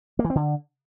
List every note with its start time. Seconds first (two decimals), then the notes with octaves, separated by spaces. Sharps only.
0.19 A#3
0.24 E3
0.30 C4
0.35 D3